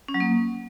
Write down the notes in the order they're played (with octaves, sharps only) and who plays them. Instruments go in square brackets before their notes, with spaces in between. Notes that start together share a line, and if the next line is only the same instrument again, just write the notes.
[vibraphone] C#4
F#3
A#3